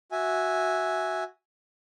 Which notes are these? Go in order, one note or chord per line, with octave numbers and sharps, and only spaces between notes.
F#4 E5 G#5